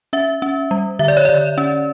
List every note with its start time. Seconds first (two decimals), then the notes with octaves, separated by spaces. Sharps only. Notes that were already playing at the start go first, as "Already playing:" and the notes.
0.13 C#4 E5
0.42 C#4
0.71 G3
0.99 D3 E5
1.08 D5
1.17 C#5
1.25 D3 D5
1.58 C#4